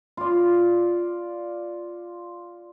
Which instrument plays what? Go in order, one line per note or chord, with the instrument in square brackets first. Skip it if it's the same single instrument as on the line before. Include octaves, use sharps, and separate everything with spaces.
[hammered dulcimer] F4 D5